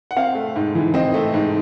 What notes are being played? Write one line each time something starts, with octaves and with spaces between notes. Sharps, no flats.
F#5
C4 F5
A3
G#2
E3
C4 D#5
A3
G#2